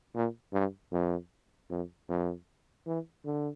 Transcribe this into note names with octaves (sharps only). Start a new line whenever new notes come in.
A#2
G2
F2
F2
F2
E3
D3